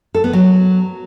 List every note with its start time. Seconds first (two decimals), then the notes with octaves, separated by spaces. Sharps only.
0.15 A4
0.24 B3
0.33 F#3